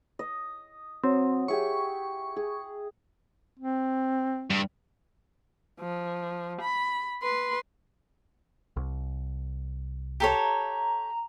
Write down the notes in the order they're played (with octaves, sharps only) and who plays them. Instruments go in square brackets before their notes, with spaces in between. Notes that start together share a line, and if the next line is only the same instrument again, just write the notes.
[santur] D#5
[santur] F#3 [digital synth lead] C4
[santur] G4 G#4 E5 [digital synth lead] C#6
[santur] G#4
[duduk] C4
[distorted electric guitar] G2
[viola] F3
B5
B4 C6
[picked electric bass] C2
[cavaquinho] G4 A4 C#5 [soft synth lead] A#5